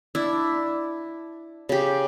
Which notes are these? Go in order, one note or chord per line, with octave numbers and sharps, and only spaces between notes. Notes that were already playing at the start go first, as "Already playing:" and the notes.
D4 E4
C#3 G4